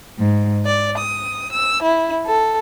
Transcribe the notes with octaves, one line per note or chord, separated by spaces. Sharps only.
G#2
D5
D#6
E6
E4
A4